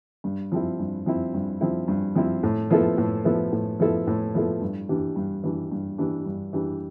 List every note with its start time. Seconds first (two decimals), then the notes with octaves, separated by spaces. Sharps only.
0.24 G2
0.52 F3 C4 E4
0.79 G2
1.06 F3 C4 E4
1.34 G2
1.61 F3 C4 E4
1.88 G2
2.15 F3 C4 E4
2.43 A2
2.70 F3 B3 E4 A4
2.98 A2
3.25 F3 B3 E4 A4
3.52 A2
3.80 F3 B3 E4 A4
4.07 A2
4.35 F3 B3 E4 A4
4.61 G2
4.89 E3 G3 D4
5.16 G2
5.43 E3 G3 D4
5.71 G2
5.98 E3 G3 D4
6.26 G2
6.53 E3 G3 D4